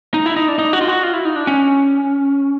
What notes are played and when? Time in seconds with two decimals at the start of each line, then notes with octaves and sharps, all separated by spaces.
0.14 D#4
0.26 E4
0.36 D#4
0.48 D4
0.59 D#4
0.73 F#4
0.81 F4
0.88 F#4
1.03 F4
1.13 E4
1.25 D#4
1.36 D4
1.47 C#4